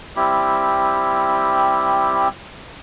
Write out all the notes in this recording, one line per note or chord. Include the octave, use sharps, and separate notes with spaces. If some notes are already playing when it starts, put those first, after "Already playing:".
G3 C4 E4 G4